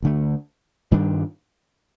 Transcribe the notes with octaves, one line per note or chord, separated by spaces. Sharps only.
D2 D3 A3
G2 D#3 G3 D4